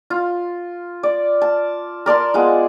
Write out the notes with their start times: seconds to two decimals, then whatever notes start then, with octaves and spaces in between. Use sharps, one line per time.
0.10 F4
1.03 D5
1.42 A5
2.06 A#4 D5 A5 C6
2.34 G#3 B3 F4